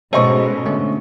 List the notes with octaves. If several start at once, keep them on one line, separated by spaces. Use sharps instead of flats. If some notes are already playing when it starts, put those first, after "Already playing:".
G#2 B2 C#4 A4 C5 D#5 C#6
D3 A3 C#4